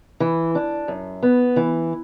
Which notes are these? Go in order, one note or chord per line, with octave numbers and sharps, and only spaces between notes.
E3
D4
F#2
B3
E3